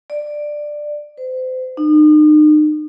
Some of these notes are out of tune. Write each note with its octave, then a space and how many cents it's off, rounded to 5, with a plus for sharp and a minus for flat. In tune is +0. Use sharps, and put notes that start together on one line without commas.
D5 +10
C5 -35
D#4 -40